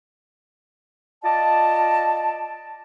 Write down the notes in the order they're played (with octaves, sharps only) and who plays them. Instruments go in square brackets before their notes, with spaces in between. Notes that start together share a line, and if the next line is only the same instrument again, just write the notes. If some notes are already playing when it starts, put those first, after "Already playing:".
[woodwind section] F4 D5 D#5 A5